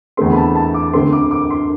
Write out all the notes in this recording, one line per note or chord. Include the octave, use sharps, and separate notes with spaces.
E2 D3 A3 C4 C6
B5
A5
A5
D6
D2 D3 A3 C4 C6
D6
D6
C6